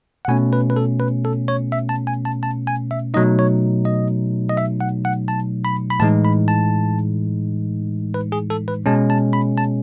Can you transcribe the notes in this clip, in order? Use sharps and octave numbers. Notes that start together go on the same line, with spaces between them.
F#5
B2 A3 C#4 G#5
B4
B4
A4
B4
A4
C#5
E5
A5
G#5
A5
A5
G#5
E5
B2 F#3 A3 D#4 D#5
C#5
D#5
D#5
E5
F#5
F#5
A5
B5
B5
A2 E3 G#3 D#4 A5
B5
A5
B4
G#4
A4
B4
B2 G#3 C#4 A5
A5
B5
A5